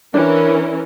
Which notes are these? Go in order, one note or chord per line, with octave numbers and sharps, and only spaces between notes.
E3 C#4 D4 A#4